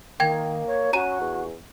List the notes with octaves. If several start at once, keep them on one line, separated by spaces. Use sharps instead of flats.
D#3 A#3 G5 G#6
C#5
C#4 F#4 A#5 D#7
E2